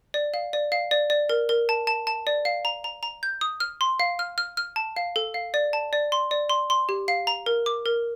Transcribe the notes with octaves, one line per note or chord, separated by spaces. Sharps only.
D5
F5
D5
F5
D5
D5
A#4
A#4
A5
A5
A5
D5
F5
A#5
A#5
A#5
G6
D#6
F6
C6
F5
F6
F6
F6
A5
F5
A4
F5
D5
A5
D5
C6
D5
C6
C6
G4
F5
A#5
A#4
D6
A#4